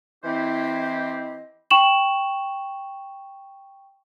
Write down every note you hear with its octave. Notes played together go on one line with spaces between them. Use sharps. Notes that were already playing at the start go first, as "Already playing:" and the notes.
E3 C4 E4 G4 C5 D#5
G5 C#6 E7 F#7